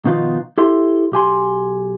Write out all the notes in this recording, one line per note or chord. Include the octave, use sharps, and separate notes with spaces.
B2 D#3 F3 B3 D#4 F4
E4 G4 A4 E5 C6
B1 G4 G#5 C6